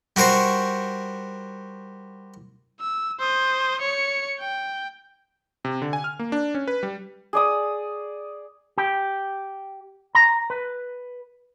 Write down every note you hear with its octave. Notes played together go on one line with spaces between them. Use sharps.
G3 F#4 A#4 C5 C#6
E6
C5 D#6
C#5 C#7
G5
C3
D3
G#5
F6
A#3
D4
C#4
B4
G3
G#4 D5 D#6
G4
A#5
B4